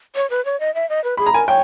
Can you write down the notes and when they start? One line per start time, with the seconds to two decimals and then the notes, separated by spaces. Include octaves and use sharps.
0.15 C#5
0.30 B4
0.45 C#5
0.60 D#5
0.75 E5
0.90 D#5
1.04 B4
1.17 G#4 B5
1.26 A#5
1.34 A#4 G#5
1.48 C#5 G5